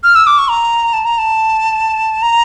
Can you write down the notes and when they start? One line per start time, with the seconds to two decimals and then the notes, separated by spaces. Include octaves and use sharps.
0.04 F6
0.15 E6
0.27 D6
0.38 C#6
0.50 A#5
0.93 A5
1.05 A#5
1.18 A5
2.22 A#5